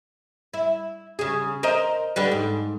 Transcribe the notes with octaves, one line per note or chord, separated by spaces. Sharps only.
E4
C#3 G#4
A#4 C5 D#5
D3 G3 B4
G#2